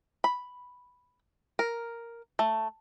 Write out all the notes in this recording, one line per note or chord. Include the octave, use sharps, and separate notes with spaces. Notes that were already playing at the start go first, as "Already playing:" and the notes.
B5
A#4
A3